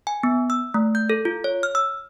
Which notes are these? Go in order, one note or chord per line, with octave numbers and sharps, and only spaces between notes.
G#5
B3
E6
A3
G6
A4
F4
C#5
F6
E6